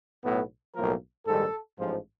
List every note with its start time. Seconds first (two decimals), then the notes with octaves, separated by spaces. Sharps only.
0.23 B1 A2 F#3 B3
0.75 B1 A2 F3 A#3 A#4
1.26 A#1 G#2 D#3 G3 A4
1.78 A1 G#2 F3